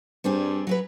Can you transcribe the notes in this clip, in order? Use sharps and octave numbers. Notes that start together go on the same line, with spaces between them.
G2 G3 C4 G#4
F#3 C#4 B4